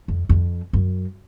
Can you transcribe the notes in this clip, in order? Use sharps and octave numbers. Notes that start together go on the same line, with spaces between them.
F2
F2
F#2